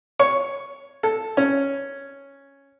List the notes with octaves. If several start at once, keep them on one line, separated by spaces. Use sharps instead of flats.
C#5
A4
C#4